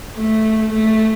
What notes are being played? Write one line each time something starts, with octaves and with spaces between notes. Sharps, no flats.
A3
A3